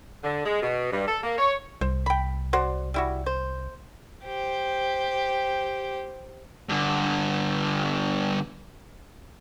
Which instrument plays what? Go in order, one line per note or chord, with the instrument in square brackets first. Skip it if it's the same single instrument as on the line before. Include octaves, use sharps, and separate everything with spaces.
[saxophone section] D3
G#3
B2
G2
A4
A#3
C#5
[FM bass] C2 [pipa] C5
[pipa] G5 B5
F#4 C5 D5
G3 E4 F#4
C5
[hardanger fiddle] G4 C5
[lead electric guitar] G2 D3